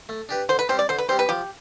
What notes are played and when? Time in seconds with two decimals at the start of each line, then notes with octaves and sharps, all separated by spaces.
0.09 A3
0.29 D4 G4 B4
0.49 D3 C5
0.59 B4
0.69 G3 C4 G4 C5
0.79 D5
0.89 D3 C5
0.98 B4
1.09 G3 C4 G4 C5
1.19 B4
1.29 F3 G4